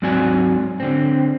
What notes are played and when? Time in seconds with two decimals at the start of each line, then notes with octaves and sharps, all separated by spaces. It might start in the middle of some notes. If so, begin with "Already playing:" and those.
0.02 G#2 F#3 C4 F#4 D5 G#5
0.80 D3 C4